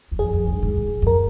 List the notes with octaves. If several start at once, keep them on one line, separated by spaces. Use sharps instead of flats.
E2
F2 G#4
F2
G2
G#2
G#2
F#2
A#4